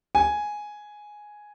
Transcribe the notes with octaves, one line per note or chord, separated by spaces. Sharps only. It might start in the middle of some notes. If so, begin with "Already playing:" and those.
G#5